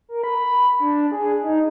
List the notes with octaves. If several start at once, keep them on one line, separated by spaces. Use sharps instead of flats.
A#4
B5
D4
G#4
D#4